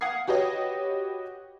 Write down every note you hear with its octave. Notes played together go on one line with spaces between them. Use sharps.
F5 F#5 D#6 G#6 C7
F#4 G4 B4 C#5 D#5